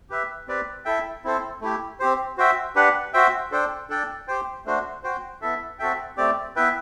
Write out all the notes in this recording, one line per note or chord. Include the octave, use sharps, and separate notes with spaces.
G4 B4 E5
C4 G4 B4 D5
E4 A4 E5 G5
C4 E4 A4 C5
A3 E4 G4
C4 G4 C5
F#4 C5 E5 G5
D4 G4 B4 F#5
F#4 C5 E5 G5
D4 A4 C5 G5
D4 A4 D5 G5
G4 C5 G5
A3 D4 F#4 C5
F#4 C5 G5
B3 E4 A4 E5
C4 F#4 A4 E5 G5
A3 C4 G4 D5
B3 E4 B4 E5 G5